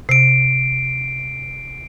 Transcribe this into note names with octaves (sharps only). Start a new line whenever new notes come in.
C3 C7 D7